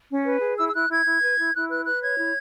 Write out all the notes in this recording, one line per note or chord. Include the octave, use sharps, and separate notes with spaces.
C#4
B4
G#4
E4 E6
E6
E4 F#6
E4 G#6
E4
B4
E4
E4 F#6
B4 F#6
B4 F#6
C#5 G#6
E4